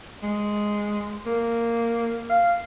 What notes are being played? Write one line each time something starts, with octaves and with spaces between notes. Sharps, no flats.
G#3
A#3
F5